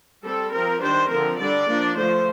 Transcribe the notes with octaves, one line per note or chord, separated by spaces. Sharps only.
G3 C4 A4
F3 C4 A#4
D#3 G3 D4 C5
D3 F3 C4 A#4
D3 G3 D4 D5
F3 A#3 D4
D3 F3 A3 C5